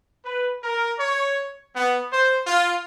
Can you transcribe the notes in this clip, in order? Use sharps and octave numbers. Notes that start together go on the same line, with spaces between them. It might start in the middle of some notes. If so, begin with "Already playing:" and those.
B4
A#4
C#5
B3
C5
F4